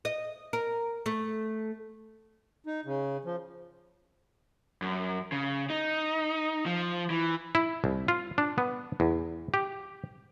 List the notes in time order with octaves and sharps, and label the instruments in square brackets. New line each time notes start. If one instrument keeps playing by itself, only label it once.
[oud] D#5
A#4
A3
[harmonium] D#4
C#3
F3
[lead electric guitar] F#2
C#3
D#4
F3
E3
[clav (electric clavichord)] E4
C2
F4
D4
B3
E2
G4